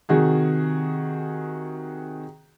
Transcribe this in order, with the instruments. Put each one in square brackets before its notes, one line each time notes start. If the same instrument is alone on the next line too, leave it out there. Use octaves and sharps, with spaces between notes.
[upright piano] C3 D#3 F#4 G#4